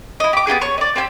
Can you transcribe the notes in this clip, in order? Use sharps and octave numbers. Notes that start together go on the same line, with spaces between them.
E4 D#5
G4 D6
B3 F4 G4 G#4
C#5 C#6
D5 D#5
C4 G4 G#5 E6